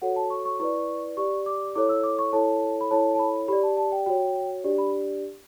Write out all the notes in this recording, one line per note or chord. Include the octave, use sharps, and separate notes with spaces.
F#4 A4 C#5 F#5
A5
C#6
C#6
E4 B4 D5 C#6
G4 D5 C#6
D6
E4 A4 C#5 D6
E6
D6
C#6
E4 A4 C#5 A5
B5
E4 A4 C#5 A5
A5
B5
G4 D5 B5
A5
A5
G5
F#4 C#5 G5
D4 G4 D5
B5